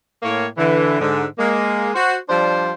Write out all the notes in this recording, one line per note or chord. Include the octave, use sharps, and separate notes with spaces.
A2 A#3 C#5
D3 E3
G#2 D3
G#3 A#3
F#4 C5
F3 G3 D4 C5